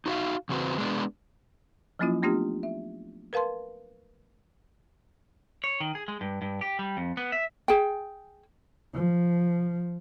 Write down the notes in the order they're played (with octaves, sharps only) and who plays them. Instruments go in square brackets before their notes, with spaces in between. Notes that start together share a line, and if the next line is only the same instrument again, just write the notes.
[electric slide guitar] D#4 F#4 A#4 E5 F5
E2 C#3 C4 F#4 B4 C5
G#3 B3 D4
[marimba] F3 F#3 A#3 C#4 E4 F4
A3 B3 D4 F4 G4
E5
A#4 B4 F5 A5 C6
[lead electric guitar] C#5
D#3
G#4
G#3
G2
G2
G4
G3
F2
B3
E5
[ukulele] G#4 G5
[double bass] F3